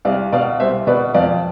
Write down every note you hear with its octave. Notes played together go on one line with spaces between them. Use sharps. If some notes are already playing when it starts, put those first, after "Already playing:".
C2 D5 F5
B2 D5 F5
C2 C5 E5
B2 B4 D5
F2 D5 F5